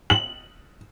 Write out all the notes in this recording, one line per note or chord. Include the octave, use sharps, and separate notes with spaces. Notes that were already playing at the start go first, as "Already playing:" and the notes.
F#7